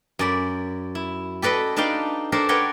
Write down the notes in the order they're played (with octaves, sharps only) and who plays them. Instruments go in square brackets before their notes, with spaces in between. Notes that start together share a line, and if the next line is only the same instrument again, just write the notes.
[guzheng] F#2 D5 B5
E4
G4 A4 B4 D5 D#5
D4 D#4 B4 D5 F5 G5
D4 G4 A4 A#4 C5
A#4 B4 C#5 D5 F#5 G5